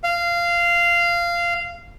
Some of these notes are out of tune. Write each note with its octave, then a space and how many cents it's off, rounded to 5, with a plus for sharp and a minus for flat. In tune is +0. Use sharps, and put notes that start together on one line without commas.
F5 -15